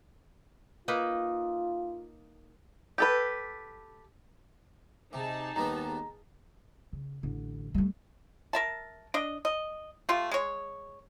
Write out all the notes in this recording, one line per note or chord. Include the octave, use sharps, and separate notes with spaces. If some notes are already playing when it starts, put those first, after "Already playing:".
A#3 D#4 F4 B4
G4 A4 B4
C3 D#4 G#4 A5
D#2 G3 B3 A#5
C#3
A1 D3
G3 A3
A#4 E5 A5
D4 D#5
D#5
A3 F4 G4
G#3 C#5